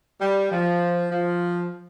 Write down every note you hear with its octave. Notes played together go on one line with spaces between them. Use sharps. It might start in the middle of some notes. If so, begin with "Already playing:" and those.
G3
F3
F3